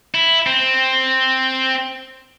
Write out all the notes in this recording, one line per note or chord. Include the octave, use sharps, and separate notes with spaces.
E4
C4